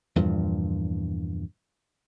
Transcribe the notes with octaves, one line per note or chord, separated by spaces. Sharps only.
E2 G2 A#2 F3